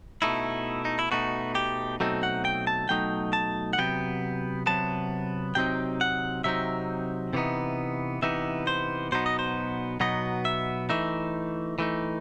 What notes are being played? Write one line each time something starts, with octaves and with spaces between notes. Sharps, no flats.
B2 A3 D#4 E4
D#4
E4
B2 A3 D#4 F#4
G4
B2 F#3 A3 C4 D#4 A4
F#5
G5
A5
B2 F#3 A3 D#4 G5
A5
F#5
C3 F#3 B3 G5
C3 F#3 B3 A5
C3 F#3 C4 D#4 G5
F#5
C3 F#3 C4 D#4 E5
C3 E3 B3 D#4
C3 E3 B3 D#4 E5
C5
B2 F#3 B3 D#4 C5
D#5
C5
B2 F#3 B3 D#4 D#5
E5
E3 A3 D#4 E5
E3 A3 D#4